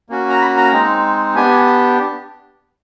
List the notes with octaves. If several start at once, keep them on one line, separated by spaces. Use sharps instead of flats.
A#3 C#4 F#4
A#5
B5
A#5
G#3 C4 D#4
B3 D4 G4 G#5